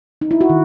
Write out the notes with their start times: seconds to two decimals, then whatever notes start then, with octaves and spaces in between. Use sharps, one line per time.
0.21 D#4
0.31 E4
0.41 F#4
0.50 D#3